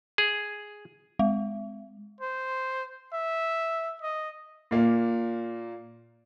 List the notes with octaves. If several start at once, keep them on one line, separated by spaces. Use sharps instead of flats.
G#4
G#3
C5
E5
D#5
A#2 A#3